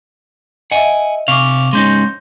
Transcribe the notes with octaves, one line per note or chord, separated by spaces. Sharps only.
D#5 E5 F#5 G#5
C3 F5 C#6 D6
G#3 C#4 D#4 C6 G6 A#6